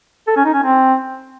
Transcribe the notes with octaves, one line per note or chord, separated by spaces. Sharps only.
A4
C#4
D#4
C#4
C4